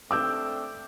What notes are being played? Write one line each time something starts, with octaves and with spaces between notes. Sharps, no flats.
A3 C4 D4 D6 E6 G6